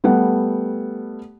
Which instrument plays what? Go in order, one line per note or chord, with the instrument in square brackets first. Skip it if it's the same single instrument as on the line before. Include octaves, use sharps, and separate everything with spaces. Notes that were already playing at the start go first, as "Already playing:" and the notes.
[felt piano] G3 A3 B3 F#5